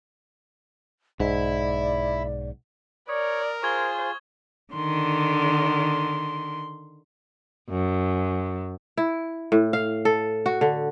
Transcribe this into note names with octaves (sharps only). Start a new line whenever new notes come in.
B1 G#2 E4 D5
A#4 C#5 D5 D#6
F4 G#4 C5 C#6 G#6 G7
D3 D#3 C6
F#2
E4
A2
F5
A4
F#4
D3